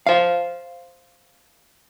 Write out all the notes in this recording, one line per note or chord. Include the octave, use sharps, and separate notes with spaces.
C5 F5